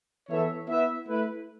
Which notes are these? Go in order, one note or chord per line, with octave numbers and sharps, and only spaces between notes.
E3 B3 A4 C#5 E5
B3 E4 B4 E5
A3 E4 B4